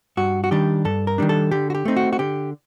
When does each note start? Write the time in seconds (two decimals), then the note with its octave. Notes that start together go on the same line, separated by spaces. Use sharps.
0.17 G2 F#4
0.44 F#4
0.51 D#3 G3 D4 G4
0.85 G2 A4
1.07 A#4
1.18 D#3 G3 D4
1.29 A4
1.51 D3 G4
1.70 F#4
1.75 G4
1.85 A3 C4 D#4
1.97 F#4
2.13 F#4
2.19 D3 G4